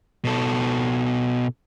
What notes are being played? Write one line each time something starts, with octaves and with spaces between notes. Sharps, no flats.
B2 A4